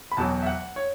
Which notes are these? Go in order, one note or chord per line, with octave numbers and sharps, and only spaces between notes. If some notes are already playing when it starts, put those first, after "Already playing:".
B5
E1 E2 B2 F#3 A5
E5
F#5
C#5